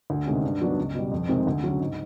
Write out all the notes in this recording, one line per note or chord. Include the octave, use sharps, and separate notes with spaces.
D2
C3 D#3 G#3 C#4
G2
D#3 F#3 B3 D4
C#2
B2 G3
F2
C3 D#3 G#3 C4
D2
C#3 F#3
G#2